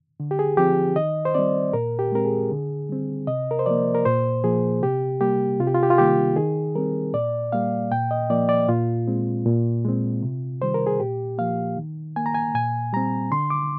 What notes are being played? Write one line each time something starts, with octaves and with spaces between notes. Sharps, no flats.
D3
G4
G#4
F3 C4 G4
D#3 D#5
C5
G3 C4 D5
A#2 A#4
G4
G#3 C4 A#4
G#4
D3
G3 C4
C3 D#5
A#4
C5
F3 A#3 D5
A#4
A#2 C5
F3 A#3 G#4
C3 G4
G3 A#3 G4
C3 F4
G4
F4
G4
F4
D#3 G3 A#3 G4
D#3 G#4
G3 C4 A#4
A#2 D5
G3 A#3 F5
A#2 G5
D#5
F3 A#3 D5
D5
A#2 F4
G#3 C4
A#2
G#3 C4
C3
D#3 G3 C5
A#4
G#4
A#2 G4
F3 A#3 F5
D#3
A#3 G#5
A#5
G#5
A#2 G#5
G3 C4 A#5
D3 C6
D6